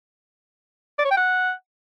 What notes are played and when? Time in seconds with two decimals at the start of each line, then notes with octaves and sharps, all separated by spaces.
0.99 D5
1.05 C#5
1.11 G5
1.17 F#5